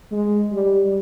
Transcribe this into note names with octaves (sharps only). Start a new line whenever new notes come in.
G#3
G3